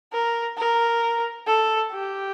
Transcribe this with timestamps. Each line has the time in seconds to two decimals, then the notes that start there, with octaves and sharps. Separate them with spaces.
0.12 A#4
0.57 A#4
1.47 A4
1.92 G4